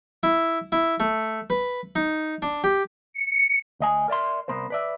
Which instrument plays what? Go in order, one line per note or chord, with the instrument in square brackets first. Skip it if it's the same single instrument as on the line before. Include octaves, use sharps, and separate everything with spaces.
[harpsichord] E4
E4
A3
B4
D#4
D4
G4
[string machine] C#7
[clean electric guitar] D2 D#5 G#5
A#4 D5 E5 C6
C2 B3 A#4 C5
B4 D5 E5